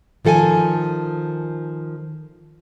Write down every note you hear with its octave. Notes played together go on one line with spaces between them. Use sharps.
D#3 F3 A4 F#5 G#5